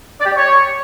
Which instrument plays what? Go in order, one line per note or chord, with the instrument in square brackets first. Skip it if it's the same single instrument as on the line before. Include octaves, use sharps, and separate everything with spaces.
[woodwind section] D5
G4
D5
C#5